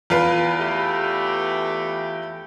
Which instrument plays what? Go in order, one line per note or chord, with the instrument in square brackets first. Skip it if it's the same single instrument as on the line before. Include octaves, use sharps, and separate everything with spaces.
[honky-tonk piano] E2 F4 B4
[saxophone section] A3 G4